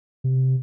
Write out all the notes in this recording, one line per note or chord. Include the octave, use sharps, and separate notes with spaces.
C3